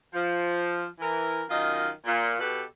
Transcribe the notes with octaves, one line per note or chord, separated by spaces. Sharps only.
F3
E3 A#4
F#2 D#3 F4 D#5
A#2
B2 G4 A4 B4